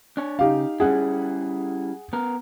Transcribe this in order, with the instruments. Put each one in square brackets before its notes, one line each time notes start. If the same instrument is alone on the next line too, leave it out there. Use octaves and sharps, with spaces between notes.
[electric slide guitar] D4 C#5
[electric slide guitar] C#3 [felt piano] D#4 G4 F5
[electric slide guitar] G3 C#4 E4 [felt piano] G#4 F#5
[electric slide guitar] B3 A#4